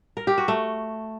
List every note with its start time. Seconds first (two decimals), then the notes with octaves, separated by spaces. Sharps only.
0.17 A#4
0.27 G4
0.38 F#4
0.48 A3